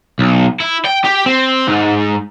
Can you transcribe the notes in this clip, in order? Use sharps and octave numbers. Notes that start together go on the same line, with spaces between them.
B1
E4
G5
G4
C4
G#2